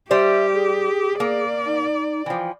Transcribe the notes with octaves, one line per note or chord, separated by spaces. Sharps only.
G3 G4 C5 D5 E5
G#4
A#3 D5
D#4
E3 F3 G5